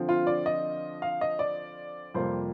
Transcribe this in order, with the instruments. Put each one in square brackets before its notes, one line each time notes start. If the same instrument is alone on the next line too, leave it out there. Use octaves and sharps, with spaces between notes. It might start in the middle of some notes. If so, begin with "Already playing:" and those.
Already playing: [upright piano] D3 F3 C4
F4
D5
D#5
F5
D#5
D5
F2 C3 G3 A#3 C5